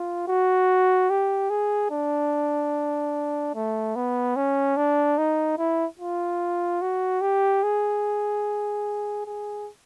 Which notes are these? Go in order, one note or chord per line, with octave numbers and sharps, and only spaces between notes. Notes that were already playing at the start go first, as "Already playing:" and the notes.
Already playing: F4
F#4
G4
G#4
D4
A3
B3
C#4
D4
D#4
E4
F4
F#4
G4
G#4
G#4